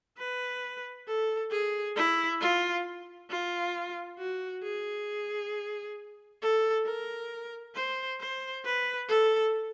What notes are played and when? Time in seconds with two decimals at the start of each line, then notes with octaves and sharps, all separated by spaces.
0.18 B4
1.07 A4
1.51 G#4
1.96 E4
2.41 F4
3.30 F4
4.18 F#4
4.63 G#4
6.42 A4
6.86 A#4
7.75 C5
8.20 C5
8.65 B4
9.08 A4